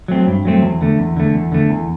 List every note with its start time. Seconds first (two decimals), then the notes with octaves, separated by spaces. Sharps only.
0.08 F#3 A3 C4
0.27 G2
0.45 F#3 A3 C4
0.62 E2
0.81 D3 A3
0.99 E2
1.17 D3 A3
1.34 E2
1.52 D3 A3
1.69 E2